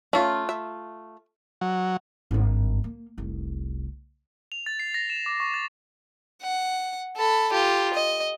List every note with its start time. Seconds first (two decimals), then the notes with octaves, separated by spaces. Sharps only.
0.13 A3 C#4 F4
0.49 E5
1.61 F#3
2.31 G#1 G2
2.84 A#3
3.18 F1 C2
4.52 F7
4.66 A6
4.80 C7
4.94 A#6
5.10 E7
5.26 D6
5.40 C#6
5.54 A6
6.42 F#5
7.17 A4 B5
7.52 F4 G4
7.94 D#5